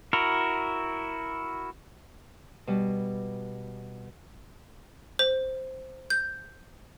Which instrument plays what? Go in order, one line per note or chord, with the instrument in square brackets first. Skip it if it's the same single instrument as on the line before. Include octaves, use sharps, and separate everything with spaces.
[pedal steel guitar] E4 F#4 A#4
[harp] B2 G3
[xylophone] C5
G6